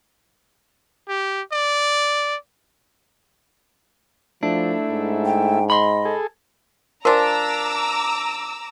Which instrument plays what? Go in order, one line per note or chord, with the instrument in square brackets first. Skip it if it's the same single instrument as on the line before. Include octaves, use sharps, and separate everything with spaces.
[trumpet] G4
D5
[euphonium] F3 [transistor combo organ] A3 E4 [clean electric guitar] D4
[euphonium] G#2
[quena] G5
[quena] D#5 [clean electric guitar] B5 C6
[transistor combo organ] G#4 A4
[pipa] F3 D4 [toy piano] A#4 G#5 [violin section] A#5 D6 E6